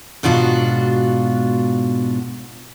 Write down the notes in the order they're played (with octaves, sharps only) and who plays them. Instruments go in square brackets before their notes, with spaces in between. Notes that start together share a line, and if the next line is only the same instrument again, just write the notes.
[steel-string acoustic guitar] G#2 B2 D4 F4 F#4